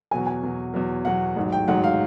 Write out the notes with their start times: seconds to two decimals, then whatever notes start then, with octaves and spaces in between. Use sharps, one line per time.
0.11 E2 B2 F#3 G#5
0.27 G#5
0.43 E2 B2 F#3
0.74 E2 B2 F#3
1.05 E2 B2 F#3 F#5
1.36 A1 G#2 D#3 F#3
1.52 G5
1.68 A1 G#2 D#3 F#3 F#5
1.84 F5